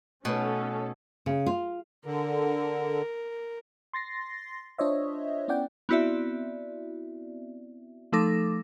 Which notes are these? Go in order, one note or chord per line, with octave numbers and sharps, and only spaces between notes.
B2 A3 C#4 D#4 A4 B4
C#3
F4
D3 A#4
C6 A6 A#6 C7
D4 F4 C5 C#5 D#5 E5
B3 C#4 E4 D5 F#5 G5
B3 C4 E4 F#4 D5 E5
F3 A3 D#4 A4 D6 A#6